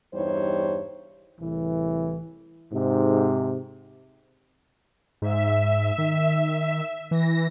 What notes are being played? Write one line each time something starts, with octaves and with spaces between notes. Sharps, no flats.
E2 G2 G3 D#4 C5 C#5
C2 A2 E3
G#2 C3
G#2 E5
D#3
E3 A#6